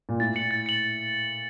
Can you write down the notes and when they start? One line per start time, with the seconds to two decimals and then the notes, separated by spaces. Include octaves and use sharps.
0.09 A#2
0.20 A2 A6
0.36 C#7 F#7
0.51 A6
0.66 C#7 F#7